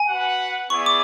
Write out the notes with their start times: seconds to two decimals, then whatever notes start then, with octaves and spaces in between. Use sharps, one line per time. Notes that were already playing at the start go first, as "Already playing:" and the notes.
Already playing: G#5
0.09 F#4 B4 F#5
0.70 B3 E4 G#4 D5 C#6
0.86 D6